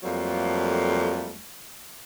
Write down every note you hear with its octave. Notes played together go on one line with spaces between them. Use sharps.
F2 F#3 G3 A3 A#3